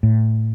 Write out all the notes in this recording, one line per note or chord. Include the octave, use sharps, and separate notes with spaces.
A2